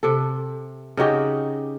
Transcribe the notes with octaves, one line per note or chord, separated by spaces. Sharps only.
C3 A4
C#3 D#4 F#4 G4